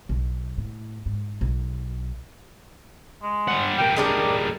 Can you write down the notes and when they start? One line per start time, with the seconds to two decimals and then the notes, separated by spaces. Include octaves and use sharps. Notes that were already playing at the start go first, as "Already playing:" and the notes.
0.09 B1
0.58 A2
1.06 G#2
1.41 B1
3.23 G#3
3.48 G3 F#5
3.78 G3 A#3 G5
3.96 G#3 D4 G4 A#4